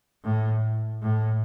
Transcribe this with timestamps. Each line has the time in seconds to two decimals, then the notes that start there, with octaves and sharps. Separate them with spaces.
0.24 A2
1.02 A2